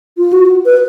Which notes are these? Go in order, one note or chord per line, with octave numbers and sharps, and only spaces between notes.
F4
F#4
B4